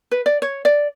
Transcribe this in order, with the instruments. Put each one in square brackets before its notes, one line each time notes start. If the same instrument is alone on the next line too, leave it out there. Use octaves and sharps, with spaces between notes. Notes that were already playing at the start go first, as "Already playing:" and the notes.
[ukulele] B4
D5
C#5
D5